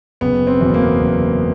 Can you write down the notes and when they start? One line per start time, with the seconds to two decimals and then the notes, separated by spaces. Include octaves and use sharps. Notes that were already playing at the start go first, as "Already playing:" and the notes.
0.21 F#1 B3
0.47 C4
0.61 E2 B2
0.74 A#3
1.00 F#1